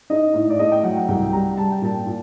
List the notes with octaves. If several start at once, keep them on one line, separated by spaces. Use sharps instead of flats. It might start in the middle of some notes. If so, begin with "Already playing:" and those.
D#4 D#5
A2
D5
A3 D#5
G5
F#3 F#5
F#5
C2 G5
G3 A#5
G3 A5
G5
A#2 A5
A#2